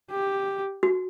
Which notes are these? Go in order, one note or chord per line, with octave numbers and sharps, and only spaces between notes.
G4
F#4